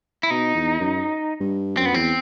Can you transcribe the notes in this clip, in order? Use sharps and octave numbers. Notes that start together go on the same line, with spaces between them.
E4
B2 D#4
E2
F#2
G2
F#2 C4
B3
F#2
E2 C4